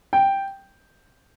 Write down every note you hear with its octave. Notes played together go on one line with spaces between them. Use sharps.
G5